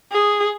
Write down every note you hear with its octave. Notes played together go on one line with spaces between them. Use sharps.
G#4